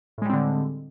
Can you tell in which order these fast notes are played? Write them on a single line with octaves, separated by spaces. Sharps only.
A2 G#3 G3 C4 D3